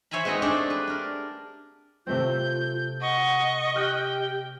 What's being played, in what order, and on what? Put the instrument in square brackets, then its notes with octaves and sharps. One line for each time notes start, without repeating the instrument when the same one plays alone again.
[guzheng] C5 C#5 E5 G#5 A#5 B5
G#3 B3 C4 D#4 D#5
G#3 A3 C4 D4 G4 G#4
B4
D4 A#4
[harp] C3 A3 C4 [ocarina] F4 [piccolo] G6
[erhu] D#5 [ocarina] F#5 [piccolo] C#6
[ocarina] G4 [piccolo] G5 [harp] F6 F#6